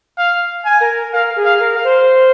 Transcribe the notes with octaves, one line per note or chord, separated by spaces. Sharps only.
F5
G#5
A#4
A#4 F5
G#4
F5
A#4
F5
C5